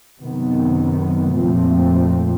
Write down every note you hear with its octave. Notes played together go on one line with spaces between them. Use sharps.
F#2 C3 D#3 B3
F2 A#2 F3 A3 C4